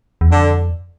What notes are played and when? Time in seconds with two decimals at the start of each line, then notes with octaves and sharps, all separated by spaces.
0.21 E2
0.30 F2 D3